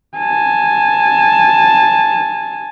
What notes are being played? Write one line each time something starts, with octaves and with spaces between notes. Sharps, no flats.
G#5 A5